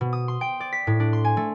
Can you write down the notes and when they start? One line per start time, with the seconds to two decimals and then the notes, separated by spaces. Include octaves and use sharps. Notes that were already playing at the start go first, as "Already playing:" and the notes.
0.01 B2
0.13 D#6
0.28 C6
0.41 G5
0.60 D5
0.73 B6
0.87 A2
1.00 D4
1.13 C6
1.25 G#5
1.37 A3